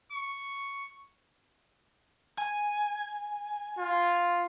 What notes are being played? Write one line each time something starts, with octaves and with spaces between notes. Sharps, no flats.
C#6
G#5
F4